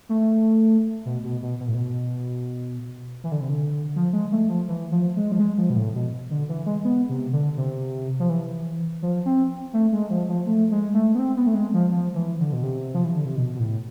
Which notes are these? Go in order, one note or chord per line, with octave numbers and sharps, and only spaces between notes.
A3
B2
B2
B2
B2
A2
B2
E3
D3
C3
D3
F3
G#3
A3
F3
E3
F3
G#3
F3
G#3
F3
B2
A2
B2
D3
E3
G#3
B3
C3
D3
C3
F3
E3
F3
C4
A3
G#3
F3
F3
A3
G#3
A3
B3
C4
B3
A3
G#3
F3
F3
E3
D3
B2
C3
F3
E3
D3
C3
B2
B2
A2